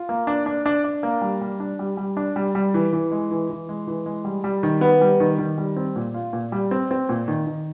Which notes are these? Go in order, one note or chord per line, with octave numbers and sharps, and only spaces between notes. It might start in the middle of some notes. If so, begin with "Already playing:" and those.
Already playing: F4
A#3
D4
D4
D4
D4
A#3
G3
G3
D4
G3
G3
D4
G3
G3
E3
E3
G#3
E3
E3
G#3
E3
G#3
G3
G3
D#3
B3
G3
D#3
D#3
G3
C4
A#2
F4
A#2
G3
C4
C4
A#2
D#3
D#3